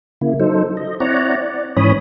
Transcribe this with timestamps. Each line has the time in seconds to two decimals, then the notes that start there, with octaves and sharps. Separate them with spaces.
0.21 C#3 A#3 E4
0.40 F#3 D#4 A4 C5
0.77 D#5
1.00 C4 E4 C#5 D5 F#5 A#5
1.36 D5
1.77 G#2 E3 C#4 C#5 B5 D#6